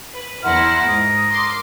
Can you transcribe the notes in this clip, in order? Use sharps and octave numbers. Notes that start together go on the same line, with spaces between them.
B4
E2 E4 A#4 F#5 C6 F6
G#2 D#6
C6 D6